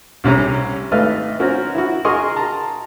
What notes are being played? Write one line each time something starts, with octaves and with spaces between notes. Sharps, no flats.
C2 C3 C#4 A#5
G#1 A3 B4 D#5 F5 F6
C4 C#4 F#4 A#4
E4 F#4
F#4 G#4 A#4 D#5 C6 C#6
A5 A#5 C6